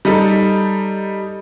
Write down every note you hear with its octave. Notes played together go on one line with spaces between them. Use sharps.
G3 D#4 A4